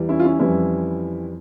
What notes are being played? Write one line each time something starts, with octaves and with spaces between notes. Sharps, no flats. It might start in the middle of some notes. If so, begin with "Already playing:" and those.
Already playing: E2 E3 G3
C#4 E4
F4
C#4 E4
F2 E3 G3 C#4 E4